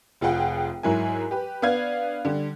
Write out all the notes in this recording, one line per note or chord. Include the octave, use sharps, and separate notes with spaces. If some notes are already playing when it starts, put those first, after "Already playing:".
F1 F4 G#4 F#5 G5
G#2 F#3 E4 A#4 G#5
G4 B4
B3 D4 F5 G#6
D3 G3